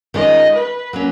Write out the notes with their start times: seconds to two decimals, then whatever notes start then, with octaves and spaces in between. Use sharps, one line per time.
0.14 D#3 G#3 C#4 F4 D#5
0.54 B4
0.93 F#3 A#3 C#4